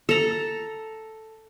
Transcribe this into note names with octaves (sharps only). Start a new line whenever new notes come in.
A4 A#5